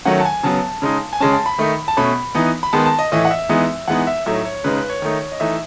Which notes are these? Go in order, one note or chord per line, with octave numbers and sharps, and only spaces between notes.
D#3 F#3 A3 C#4 F#5
A5
G#5
C#3 F#3 B3 A5
C#3 G#3 D#4
G#5
C#3 G#3 C#4 A5
A5
B5
D#3 A3 D#4
A5
B2 A3 C#4 B5
E3 B3 D#4
B5
D#3 G#3 B3 A5
A5
D#5
A2 E3 A3 D#5
F#5
E5
E3 G#3 B3 D#4
E3 G#3 B3 D#4 F#5
E5
A2 F#3 A3 D#4 E5
C#5
C#3 G#3 D#4 B4
B4
C#5
D#3 A3 D#4
D#5
E3 A3 D#4 E5